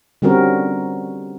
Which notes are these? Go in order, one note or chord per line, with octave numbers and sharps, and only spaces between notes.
D3 G3 C4 C#4 F#4 A#4